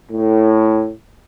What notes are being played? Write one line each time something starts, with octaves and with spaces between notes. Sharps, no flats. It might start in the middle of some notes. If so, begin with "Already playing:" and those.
A2